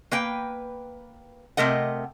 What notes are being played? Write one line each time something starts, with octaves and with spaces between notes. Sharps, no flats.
A#3 B4 G5
C3 A3 A#4 D#5 F#5